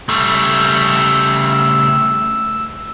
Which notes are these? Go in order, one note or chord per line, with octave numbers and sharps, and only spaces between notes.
C#3 G3 A3 E6